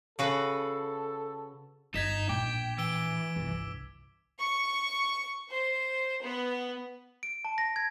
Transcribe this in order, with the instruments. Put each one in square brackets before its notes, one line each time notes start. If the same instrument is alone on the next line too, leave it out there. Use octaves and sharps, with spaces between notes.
[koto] C#3 F#4 B4 [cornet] A4
[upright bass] G1 B3 [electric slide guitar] D#4 D#5 [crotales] G#6 B6 E7
[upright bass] A#1 A2 [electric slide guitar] G5 [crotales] D6
[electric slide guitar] E3 [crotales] E6 D7 G7
[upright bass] G1 C2
[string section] C#6
C5
B3
[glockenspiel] D7
A5
A#6
G#6